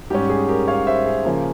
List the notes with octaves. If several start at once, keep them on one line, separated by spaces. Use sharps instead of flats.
G#2 G3 C#4 G4
G#4
G4 A#4
C#5 F5
C5 E5
G#4
C#3 F3 A#3